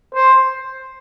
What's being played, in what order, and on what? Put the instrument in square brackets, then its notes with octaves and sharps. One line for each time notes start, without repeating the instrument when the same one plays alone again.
[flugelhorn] C5